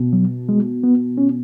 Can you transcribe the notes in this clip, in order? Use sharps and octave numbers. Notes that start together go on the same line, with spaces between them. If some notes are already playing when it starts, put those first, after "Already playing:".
Already playing: B2
F#3
G#3
B3
C#4